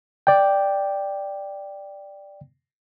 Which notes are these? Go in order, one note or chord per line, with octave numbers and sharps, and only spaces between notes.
D5 G5